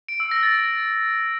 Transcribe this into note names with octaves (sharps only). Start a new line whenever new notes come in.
D7
E6
A#6
A6
A#6